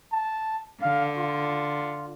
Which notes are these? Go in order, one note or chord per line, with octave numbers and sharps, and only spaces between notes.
A5
D3 F5
F4